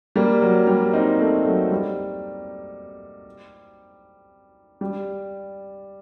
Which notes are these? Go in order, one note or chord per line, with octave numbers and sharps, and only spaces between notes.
G3 A#3
F#3
G3
C4 D#4
A3 C4
F#3 A3
G3
G3